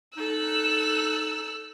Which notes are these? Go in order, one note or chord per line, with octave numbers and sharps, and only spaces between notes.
D#4 A4 E6 F#6